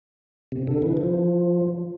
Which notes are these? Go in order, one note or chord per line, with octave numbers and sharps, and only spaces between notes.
C3
D3
E3
F3